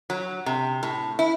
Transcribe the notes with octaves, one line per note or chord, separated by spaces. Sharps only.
F#3
C3
A2
E4